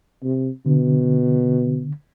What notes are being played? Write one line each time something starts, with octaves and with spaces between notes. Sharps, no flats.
C3
B2 D3